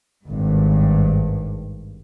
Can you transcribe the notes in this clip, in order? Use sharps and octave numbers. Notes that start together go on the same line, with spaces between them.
G#1 G2